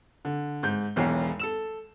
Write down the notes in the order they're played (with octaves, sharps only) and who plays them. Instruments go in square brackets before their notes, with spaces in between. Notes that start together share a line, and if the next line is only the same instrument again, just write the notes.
[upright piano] D3
G#2 G6
E1 B1 E2 C#5 C7
A4 E6 E7